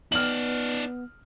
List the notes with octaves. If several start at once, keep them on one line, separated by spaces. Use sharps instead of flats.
B3 D#4 D5 F6 F#7